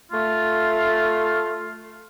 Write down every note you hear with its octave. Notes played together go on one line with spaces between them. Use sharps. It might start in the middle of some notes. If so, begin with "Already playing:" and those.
A3 F4